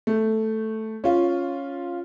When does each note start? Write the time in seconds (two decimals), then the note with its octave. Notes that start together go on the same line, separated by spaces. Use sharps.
0.07 A3
1.04 C#4 F4